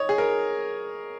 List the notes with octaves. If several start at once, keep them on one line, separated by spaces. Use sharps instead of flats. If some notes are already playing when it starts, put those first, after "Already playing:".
Already playing: C#5 D#5
G#4
A#4